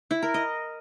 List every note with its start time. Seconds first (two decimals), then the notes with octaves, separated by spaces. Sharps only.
0.11 E4
0.22 A#4
0.34 D#5